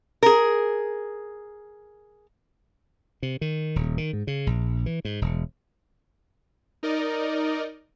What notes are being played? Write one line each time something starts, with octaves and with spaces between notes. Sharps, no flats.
G#4 A#4
C3
D#3
D#1
D#3
G#2
C#3
A#1
E3
G#2
E1
D#4 A#4 D5 D#5